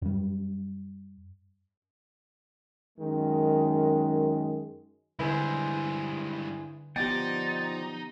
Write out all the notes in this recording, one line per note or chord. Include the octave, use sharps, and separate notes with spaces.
F#2 G3
F#2 D#3 G#3
G2 D3 G#3 E4 G#4 B4 C5
F3 B3 D#4 G4 D5 G5 A6